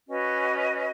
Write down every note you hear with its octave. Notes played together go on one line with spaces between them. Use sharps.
C#4 F#4 B4 D#5